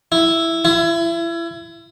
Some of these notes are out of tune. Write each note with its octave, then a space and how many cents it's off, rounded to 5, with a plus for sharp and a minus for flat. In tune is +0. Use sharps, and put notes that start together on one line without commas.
E4 +0
E4 +30